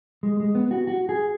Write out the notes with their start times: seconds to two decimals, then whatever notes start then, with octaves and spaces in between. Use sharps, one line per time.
0.23 G#3
0.40 G#3
0.55 B3
0.71 F#4
0.87 F#4
1.09 G#4